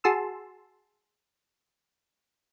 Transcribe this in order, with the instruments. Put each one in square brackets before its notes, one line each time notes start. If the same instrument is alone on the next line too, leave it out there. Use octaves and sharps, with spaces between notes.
[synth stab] F#4 G#4 A5 C6 E6